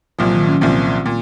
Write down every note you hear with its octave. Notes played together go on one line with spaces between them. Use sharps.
C2 A#2 F3 F#3
D#3
C#4
C2 A#2 F3 C4
A#2